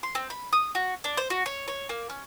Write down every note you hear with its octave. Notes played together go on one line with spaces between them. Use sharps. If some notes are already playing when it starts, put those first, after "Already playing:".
C6
C4
B5
D#6
F#4
D4
C5
F#4
C#5
C#5
A#3
C#4